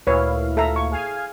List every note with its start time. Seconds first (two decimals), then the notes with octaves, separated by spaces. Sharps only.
0.07 D2 A#2 E4 B4 C#5 F5
0.57 A4 E5 A#5
0.76 C#6
0.91 G#4 F5 G#5